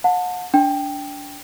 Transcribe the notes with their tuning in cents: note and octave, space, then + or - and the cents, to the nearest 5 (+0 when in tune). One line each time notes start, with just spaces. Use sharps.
F#5 -40 A5 +15
D4 -20 G5 +0